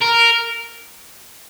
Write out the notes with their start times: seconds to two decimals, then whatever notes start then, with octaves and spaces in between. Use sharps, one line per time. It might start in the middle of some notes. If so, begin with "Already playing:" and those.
0.02 A#4